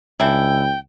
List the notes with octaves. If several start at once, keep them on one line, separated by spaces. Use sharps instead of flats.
C#2 E3 D4 E4 G5